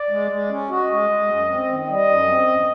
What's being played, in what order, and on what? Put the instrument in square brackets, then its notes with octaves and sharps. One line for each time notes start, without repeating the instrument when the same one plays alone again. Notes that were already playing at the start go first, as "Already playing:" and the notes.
Already playing: [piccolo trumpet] D5
[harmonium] G#3
G#3
C#4
[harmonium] F#4 [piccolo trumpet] D#5
[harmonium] G#3
G#3
F#2
C4
D#3
[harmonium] G3 [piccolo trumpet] D#5
[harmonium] F#2
C4
E2